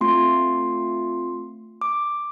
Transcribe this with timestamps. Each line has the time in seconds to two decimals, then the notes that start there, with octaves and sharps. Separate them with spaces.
0.01 A3 C4 F4 C6
1.81 D6